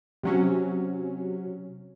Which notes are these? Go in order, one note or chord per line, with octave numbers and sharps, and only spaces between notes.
C3 F#3 C#4